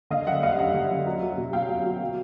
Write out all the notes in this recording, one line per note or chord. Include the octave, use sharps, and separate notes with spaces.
D3 D#5 F5
F#2 E5 F#5
G3 D#5 F5
F#2 E5 F#5
D3
F#2
F#3
F#3
B2
B2 F5 G5
F#3
F#3
F#3